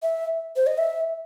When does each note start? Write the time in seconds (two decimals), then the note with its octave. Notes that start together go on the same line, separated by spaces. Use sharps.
0.03 E5
0.56 C5
0.67 D#5
0.78 E5